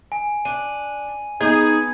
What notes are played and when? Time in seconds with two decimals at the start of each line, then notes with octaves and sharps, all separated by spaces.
0.12 G#5
0.45 D4 D#7
1.41 B3 D#4 G#4 G#6